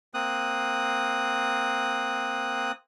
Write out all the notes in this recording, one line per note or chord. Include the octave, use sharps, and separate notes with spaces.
A#3 C4 D#6 F#6